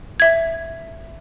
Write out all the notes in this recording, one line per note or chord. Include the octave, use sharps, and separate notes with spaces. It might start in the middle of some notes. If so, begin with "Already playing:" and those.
E5 G#6